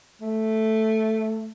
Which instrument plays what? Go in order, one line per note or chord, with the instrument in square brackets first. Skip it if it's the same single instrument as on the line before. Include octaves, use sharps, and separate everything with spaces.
[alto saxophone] A3